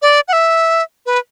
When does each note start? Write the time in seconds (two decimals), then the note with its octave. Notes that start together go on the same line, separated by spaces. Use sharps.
0.02 D5
0.28 F#5
0.33 E5
1.06 B4